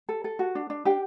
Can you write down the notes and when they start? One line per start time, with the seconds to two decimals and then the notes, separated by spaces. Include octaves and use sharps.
0.09 A4
0.24 A4
0.39 F#4
0.55 D4
0.70 D4
0.85 D4 G4 G5